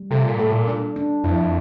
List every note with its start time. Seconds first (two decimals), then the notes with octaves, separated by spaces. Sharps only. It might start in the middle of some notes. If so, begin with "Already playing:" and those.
Already playing: G3
0.11 C3 A4
0.24 A#2
0.38 A2 A4
0.51 A#2
0.68 D4
0.96 D4
1.24 F2 E4